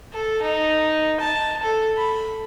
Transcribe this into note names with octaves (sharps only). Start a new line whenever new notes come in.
A4
D#4
A5
A4
B5